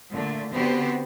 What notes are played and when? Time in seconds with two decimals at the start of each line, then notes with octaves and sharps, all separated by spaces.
0.11 A#2 D3 A3
0.52 D3 B3 C4 F#4 G4 C5